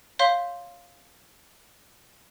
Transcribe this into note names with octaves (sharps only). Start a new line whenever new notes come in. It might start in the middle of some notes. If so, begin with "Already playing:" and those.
C#5 F5 C6 G6 B6